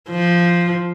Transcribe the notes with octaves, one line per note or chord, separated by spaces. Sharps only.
F3